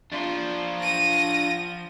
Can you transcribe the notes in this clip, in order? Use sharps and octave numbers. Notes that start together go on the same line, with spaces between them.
F3 D4 F4 C6
A#6 D#7